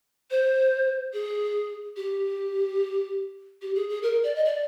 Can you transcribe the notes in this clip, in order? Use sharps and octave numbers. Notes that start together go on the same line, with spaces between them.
C5
G#4
G4
G4
G#4
G#4
A#4
D5
D#5
D5